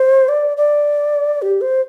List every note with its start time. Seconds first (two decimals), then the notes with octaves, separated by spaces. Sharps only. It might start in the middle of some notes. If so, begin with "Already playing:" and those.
Already playing: C5
0.28 D5
0.57 D5
1.42 G4
1.61 C5